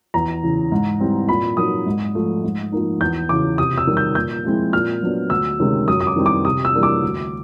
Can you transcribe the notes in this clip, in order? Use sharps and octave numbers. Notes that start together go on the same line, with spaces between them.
E2 A#5
C#3 E3
G#2
E3 G3 C4
A#2 B5
F#3 A#3 D#4 D#6
G#2
F3 A3
G#2
F3 A#3 D#4
E2 G6
C#3 E3 D6
C3 D#6
E6
D#3 G3
G6
A#2 G6
F3 G#3 C4 E4
A#2 F6
F#3 B3 D4
D2 E6
C3 D#3 G#3 C#4
F#2 D#6
D#6
D6
D#3 G3 C4 E4
D6
C3 D#6
E6
E3 G3 A#3 D4
D6
D2